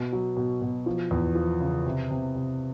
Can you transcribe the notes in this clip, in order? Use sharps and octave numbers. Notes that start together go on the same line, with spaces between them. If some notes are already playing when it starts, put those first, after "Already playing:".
Already playing: B2
F#3
B2
B2
F3
E2
F3
C#3
C3
C3
C3